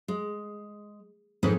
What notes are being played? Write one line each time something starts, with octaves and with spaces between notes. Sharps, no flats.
G#3
F2 G#2 D#3 C4 B4